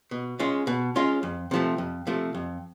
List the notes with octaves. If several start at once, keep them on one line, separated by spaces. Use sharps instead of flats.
B2
G#3 C#4 F4
B2
G#3 C#4 F4
F2
C3 F3 A3
F2
C3 F3 A3
F2